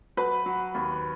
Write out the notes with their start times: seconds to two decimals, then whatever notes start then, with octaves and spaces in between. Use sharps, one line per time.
0.17 F#3 B4 B5
0.46 F#3
0.74 D#2